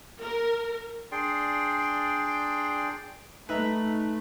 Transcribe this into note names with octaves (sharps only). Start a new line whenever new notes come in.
A#4
D4 G#4 D5 G5 C6
A3 D#4 B4 E5 A#5